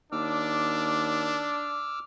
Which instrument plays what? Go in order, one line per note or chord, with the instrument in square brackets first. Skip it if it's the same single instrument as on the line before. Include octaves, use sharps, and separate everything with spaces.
[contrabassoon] D#2 [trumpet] D4 [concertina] D6 E6 F6